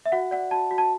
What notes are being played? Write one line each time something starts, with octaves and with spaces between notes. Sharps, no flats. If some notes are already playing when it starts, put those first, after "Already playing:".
E5
F#4 F#5
D5 F#5
F#4 A5
F#4
A5